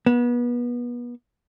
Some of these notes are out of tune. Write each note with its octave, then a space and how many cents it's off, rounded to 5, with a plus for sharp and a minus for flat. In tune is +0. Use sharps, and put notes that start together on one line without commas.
B3 -30